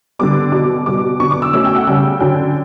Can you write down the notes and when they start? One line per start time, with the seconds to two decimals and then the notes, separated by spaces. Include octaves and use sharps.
0.19 D3 G3 B3 D6
0.52 B2 F#3 B3 D6
0.86 B2 G3 B3 D6
1.20 D3 F#3 B3 C#6
1.31 D6
1.42 E6
1.53 B2 A3 C#4 E6
1.65 G5
1.76 F#5
1.87 C#3 G3 C#4 G5
2.20 D3 F#3 C#4 G5